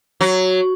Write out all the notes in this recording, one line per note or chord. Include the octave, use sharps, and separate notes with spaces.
F#3